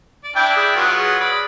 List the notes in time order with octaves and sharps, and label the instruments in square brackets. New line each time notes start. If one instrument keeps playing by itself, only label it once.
[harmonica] D5
[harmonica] D4 E4 D5 [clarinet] G5
[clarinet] G#4
[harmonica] F#3 B3 F4
[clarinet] G#4
[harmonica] D5 B5